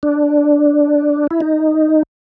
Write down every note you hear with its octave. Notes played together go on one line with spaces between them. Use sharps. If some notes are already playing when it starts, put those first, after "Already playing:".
D4
E4
D#4